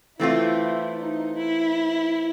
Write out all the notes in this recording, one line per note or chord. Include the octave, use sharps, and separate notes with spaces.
E3 A3 C4 E4 F4
D#4
E4